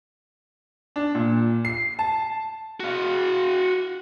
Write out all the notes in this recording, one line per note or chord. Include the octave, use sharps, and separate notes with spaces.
D4
A#2
C7
A5
F#4 F5